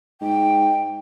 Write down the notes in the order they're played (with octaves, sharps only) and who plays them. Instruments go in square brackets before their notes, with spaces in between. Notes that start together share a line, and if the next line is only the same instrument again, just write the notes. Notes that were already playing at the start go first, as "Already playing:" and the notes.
[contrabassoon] G#2 [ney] G5